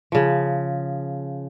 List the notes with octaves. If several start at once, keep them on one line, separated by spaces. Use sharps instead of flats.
C#3 F3